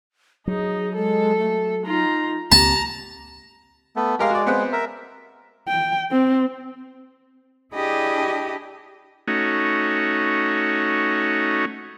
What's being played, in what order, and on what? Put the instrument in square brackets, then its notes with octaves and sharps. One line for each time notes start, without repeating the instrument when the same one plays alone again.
[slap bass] F#3 [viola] D#4 [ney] G#4
[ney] G#3 [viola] A4
[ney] A3
[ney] D#4 [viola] F4 A#5
[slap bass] C#2 A#3 C4 [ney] G4 [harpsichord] A5 [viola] A#5
[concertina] A3 B3
[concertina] G#3 [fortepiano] G4 A#4 F5
[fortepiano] F#4 D5
B3 C4 F#5
[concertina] A#4 E5
[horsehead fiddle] G5
C4
[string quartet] D4 E4 G4 G#4 D#5 B5
[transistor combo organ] A3 C#4 D#4 F#4